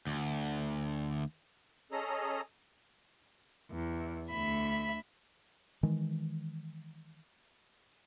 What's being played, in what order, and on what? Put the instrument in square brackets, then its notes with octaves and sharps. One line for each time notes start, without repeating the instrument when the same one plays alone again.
[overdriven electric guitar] D2
[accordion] C#4 G#4 A4 D#5 A#5
[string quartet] E2
D2 E5 B5
[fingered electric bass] D#3 E3 G#3